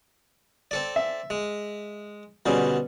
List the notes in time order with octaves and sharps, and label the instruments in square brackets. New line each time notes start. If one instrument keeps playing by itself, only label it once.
[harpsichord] C4 A4 D5
[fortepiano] E5
[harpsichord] G#3
[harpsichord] B2 D3 C4 [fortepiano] G3 C#4 G#4